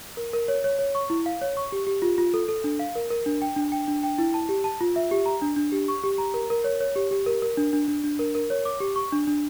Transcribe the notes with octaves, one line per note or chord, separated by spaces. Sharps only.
A#4
A#4
C#5
C#5
C#5
C#6
E4
F5
C#5
C#6
G4
G4
F4
F4
A4
A4
D4
F5
A#4
A#4
D4
G5
D4
G5
D4
G5
E4
A5
G4
A5
F4
E5
G4
A#5
D4
D4
G4
C#6
G4
A#5
A#4
A#4
C#5
C#5
G4
G4
A#4
A#4
D4
D4
D4
D4
A#4
A#4
C#5
D6
G4
C#6
D4
D4